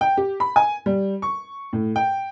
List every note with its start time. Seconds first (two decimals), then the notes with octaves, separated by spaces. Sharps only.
0.01 G5
0.17 G4
0.40 B5
0.56 G#5
0.86 G3
1.22 C#6
1.73 A2
1.96 G5